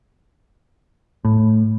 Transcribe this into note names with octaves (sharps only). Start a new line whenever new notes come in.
A2